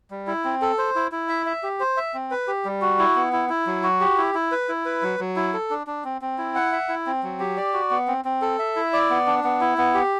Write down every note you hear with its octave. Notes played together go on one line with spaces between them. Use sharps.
G3
E4
C4
A4
C5
E4
E4
E5
E5
G4
C5
E5
C4
B4
G4
G3
F#4
E4
B3
E4
E4
F#3
F#4
G4
E4
E4
B4
E4
B4
F#3
F#3
E4
A4
D4
D4
C4
C4
E4
F#5
E5
E4
C4
F#3
G4
D5
F#4
B3
C4
C4
A4
E5
E4
D5
B3
D4
B3
E4
B3
G4